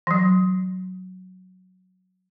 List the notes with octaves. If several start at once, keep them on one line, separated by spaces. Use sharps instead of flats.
E3 F#3